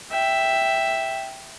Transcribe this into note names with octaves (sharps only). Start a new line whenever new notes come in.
E5 G5